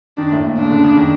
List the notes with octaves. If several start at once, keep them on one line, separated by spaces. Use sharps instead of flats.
D#3 D4
A2
A#2
A#2 D4
C#3
D3
C#3
D#3